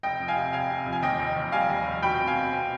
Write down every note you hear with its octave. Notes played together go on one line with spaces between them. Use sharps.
F1 D#5 G5
F2
F5 G#5
C3
F1 F5 G#5
C3
F2
G#5
D#2 D#5 G5
F1
D#2
G3 F5 G#5
D#2
F1
B2 G5 B5
C4
F5 G#5
B2
C4